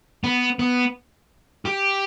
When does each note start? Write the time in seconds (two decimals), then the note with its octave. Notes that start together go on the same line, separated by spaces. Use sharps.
0.24 B3
0.59 B3
1.66 G4